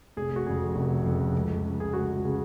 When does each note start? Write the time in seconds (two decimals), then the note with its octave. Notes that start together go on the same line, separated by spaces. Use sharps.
0.17 F1 G#4
0.36 F#4
0.46 F2 C#3 G#4
0.75 F1
1.06 F2 C#3
1.34 C#2
1.64 C#3
1.80 G#4
1.93 C#2 F#4
2.24 C#3